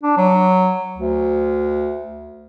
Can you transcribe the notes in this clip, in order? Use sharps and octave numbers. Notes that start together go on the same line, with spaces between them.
D4
F#3
D2